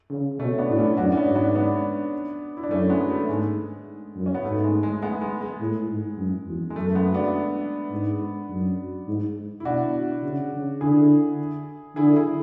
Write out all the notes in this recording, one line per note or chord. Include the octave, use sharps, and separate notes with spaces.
C#3
B2 A3 C#4
B3 D4
A2 D4
C#4 E4
F#2 D4 F#4
C#4
B3 D4
G#2
B3 D4
B3 D4
E4
D4
F#2 A3 C#4
G#3 B3
A3
G#2 G#3
F#2
C#4
B3
G#2 A3
G#3
G#3
G#3 B3
G#3
G#3
A2
G#2
F#2
E2
G#3
F#2 A3
A3
G#3 B3
B3 D4
G#2
F#2
G#2
E4
B2 D4 F#4
C#3
C#3
D3 E4 G#4
D3 E4 G#4
E4 G#4